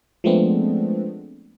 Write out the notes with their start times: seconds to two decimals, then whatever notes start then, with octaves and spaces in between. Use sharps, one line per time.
0.24 F3 G#3 A3 B3 C4 D4